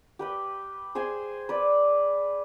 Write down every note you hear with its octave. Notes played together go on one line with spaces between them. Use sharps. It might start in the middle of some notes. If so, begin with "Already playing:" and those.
G4 B4 G5
G#4 C5 G5 G#5
B4 D5